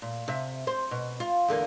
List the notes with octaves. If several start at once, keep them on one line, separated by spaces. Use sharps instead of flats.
A#2
C3 E5
C5
B2
F4
E2 D3 A#3